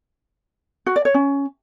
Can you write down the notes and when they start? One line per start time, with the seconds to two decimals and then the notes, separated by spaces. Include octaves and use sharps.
0.86 F#4
0.96 D5
1.05 C#5
1.14 C#4